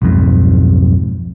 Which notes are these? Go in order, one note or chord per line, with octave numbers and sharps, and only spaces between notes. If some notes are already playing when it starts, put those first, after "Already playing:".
B1 F2 G#2